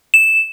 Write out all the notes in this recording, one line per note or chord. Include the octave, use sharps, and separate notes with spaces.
E7